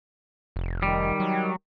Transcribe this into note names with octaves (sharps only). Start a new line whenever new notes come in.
F1
D#3 G3
F#3